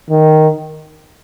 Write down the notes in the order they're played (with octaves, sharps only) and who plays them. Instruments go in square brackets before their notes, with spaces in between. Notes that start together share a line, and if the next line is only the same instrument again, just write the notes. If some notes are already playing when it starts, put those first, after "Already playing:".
[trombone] D#3